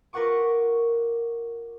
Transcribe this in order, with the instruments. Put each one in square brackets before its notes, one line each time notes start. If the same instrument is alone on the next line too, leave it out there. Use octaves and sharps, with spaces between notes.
[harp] F4 A#4 B4 F#5 C#6 D6